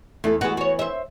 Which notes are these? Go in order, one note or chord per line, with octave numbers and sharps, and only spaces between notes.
E2 A3 E4 A4
E3 G#3 B3 F#4
F#4 C#5
C5 E5